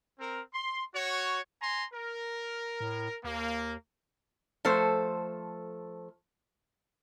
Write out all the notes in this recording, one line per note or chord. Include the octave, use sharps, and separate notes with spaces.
C4 A#4
C6
F#4 C#5
G#5 A#5 C6
A#4
A2
D#2 A#3
F3 A3 A4 C5